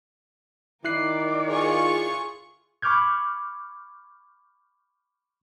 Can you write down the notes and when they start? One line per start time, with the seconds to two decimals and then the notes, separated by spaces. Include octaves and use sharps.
0.85 D#3 E4 A#4 D5 F#6 C7
1.49 F4 G#4 C#6
2.82 B5 C#6 D6 F6 G6 G#6